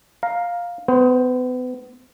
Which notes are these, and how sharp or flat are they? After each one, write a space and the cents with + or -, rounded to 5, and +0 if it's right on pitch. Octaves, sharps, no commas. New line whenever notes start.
F5 +5 A#5 +0
B3 +30 C5 +5